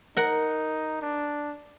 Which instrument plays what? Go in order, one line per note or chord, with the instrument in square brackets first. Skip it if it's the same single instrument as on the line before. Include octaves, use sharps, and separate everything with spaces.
[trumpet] D#4 [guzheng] A#4 F#5
[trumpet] D4